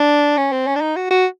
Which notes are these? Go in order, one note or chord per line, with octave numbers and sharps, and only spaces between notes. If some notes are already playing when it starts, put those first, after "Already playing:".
Already playing: D4
C#4
C4
C#4
D4
D#4
F#4
F#4